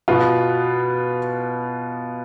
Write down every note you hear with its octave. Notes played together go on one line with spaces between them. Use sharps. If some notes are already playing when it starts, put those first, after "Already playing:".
B2 B3 F4